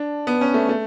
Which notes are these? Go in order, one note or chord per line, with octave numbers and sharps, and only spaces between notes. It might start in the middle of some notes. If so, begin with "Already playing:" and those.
Already playing: D4
B3
C#4
A3
A3